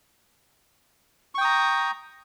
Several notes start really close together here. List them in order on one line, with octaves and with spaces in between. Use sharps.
C#6 G5 D#6 A#5